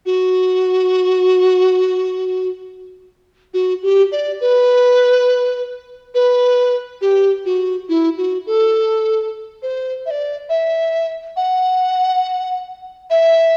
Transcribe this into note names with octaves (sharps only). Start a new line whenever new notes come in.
F#4
F#4
G4
D5
B4
B4
G4
F#4
E4
F#4
A4
C5
E5
D5
E5
F#5
E5